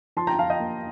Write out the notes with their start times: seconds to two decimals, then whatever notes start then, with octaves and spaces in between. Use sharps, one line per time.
0.16 F3 A5 C6
0.27 G5 A#5
0.39 F3 F5 A5
0.50 D#5 G5
0.60 A#3